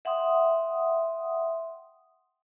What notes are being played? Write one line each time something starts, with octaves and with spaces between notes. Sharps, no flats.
E5 F#5 G5 C6 D#6